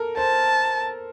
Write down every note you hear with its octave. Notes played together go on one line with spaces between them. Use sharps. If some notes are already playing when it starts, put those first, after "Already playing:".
Already playing: A4 A#4
C5 A5